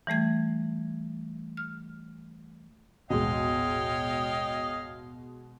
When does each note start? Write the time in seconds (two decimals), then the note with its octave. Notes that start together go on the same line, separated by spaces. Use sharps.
0.07 E3 G3 A3 G#6
1.57 F6
3.10 D#1 A1 B2 G#3 C#5 D#5 F5 G5